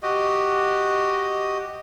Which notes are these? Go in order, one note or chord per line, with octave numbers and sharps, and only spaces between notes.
F#4 G4 D#5